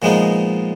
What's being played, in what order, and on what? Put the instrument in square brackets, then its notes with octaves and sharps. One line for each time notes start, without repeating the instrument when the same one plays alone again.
[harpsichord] A#2 F3 G#3 B3 D#4